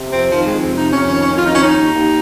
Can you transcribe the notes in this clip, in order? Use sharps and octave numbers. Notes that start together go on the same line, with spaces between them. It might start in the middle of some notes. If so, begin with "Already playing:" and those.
Already playing: C3
F2 C4
D#3 F3
G#3
F2
C4
C3 D#4
F2 C#4
D#3 C#4
C#4
F2
F4
D#4
D#3 C#4
D#4
D#2
D#2